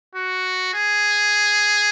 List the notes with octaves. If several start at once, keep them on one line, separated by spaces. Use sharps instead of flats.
F#4
G#4